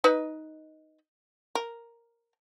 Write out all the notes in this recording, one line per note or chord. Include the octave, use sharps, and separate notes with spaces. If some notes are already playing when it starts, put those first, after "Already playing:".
D#4 B4 D#5
A#4